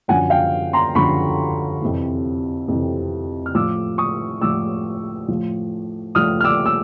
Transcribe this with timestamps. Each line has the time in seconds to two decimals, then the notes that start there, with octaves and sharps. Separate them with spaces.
0.08 F#2 D3 F3 F#5 G#5
0.30 F5 G5
0.73 A#5 C6
0.95 F#2 D3 F3 B5 C#6
1.82 F2 C3 E3
2.68 F2 C3 E3
3.46 F6
3.55 A2 F3 D6 E6
3.98 C#6 D#6
4.42 A2 F3 D6 E6
5.28 A2 F3
6.15 A2 F3 D#6 F6
6.40 F6
6.44 D6 E6
6.66 E6